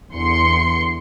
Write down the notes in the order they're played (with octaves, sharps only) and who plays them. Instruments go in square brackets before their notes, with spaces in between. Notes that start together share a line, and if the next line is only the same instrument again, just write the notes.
[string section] E2 D3 C6 C#7